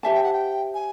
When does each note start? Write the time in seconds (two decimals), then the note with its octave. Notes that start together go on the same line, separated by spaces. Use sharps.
0.03 G4 C5 E5 G#5 A5
0.13 G5
0.24 F#5
0.33 G5
0.74 G#5